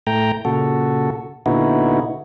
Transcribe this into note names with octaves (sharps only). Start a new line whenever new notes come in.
A2 A3 G5 A#5
A#2 C#3 F#4 A4
A#2 D3 B3 D#4 E4 F#4